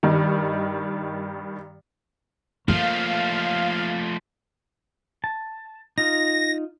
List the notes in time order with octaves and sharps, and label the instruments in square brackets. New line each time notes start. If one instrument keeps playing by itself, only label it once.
[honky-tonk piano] G2 D#3
[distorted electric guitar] F3 A3 [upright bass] A#3 [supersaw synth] F5
[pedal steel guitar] A5
[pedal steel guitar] D#4 F4 [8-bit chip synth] A#6